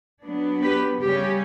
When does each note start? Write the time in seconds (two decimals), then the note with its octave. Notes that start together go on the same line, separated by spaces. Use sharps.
0.24 F#3 B3 D4
0.62 G4 B4
1.02 C#3 G3 C#4 G4